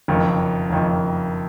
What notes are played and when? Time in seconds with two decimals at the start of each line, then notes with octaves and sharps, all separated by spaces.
0.08 F#1 F2 D#3
0.70 F#1 F2 D#3